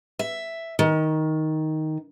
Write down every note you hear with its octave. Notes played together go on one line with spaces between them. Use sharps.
E5
D#3